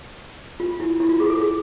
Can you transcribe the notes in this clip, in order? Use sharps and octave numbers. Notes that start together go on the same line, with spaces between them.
F4
E4
E4
F4
G#4
A4
G#4